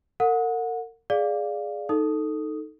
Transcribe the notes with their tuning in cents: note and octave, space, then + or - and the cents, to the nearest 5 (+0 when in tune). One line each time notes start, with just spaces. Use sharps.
A#4 -40 F#5 -25
G#4 +0 D5 +0 F5 +0
D#4 +0 A4 +0 D#6 +0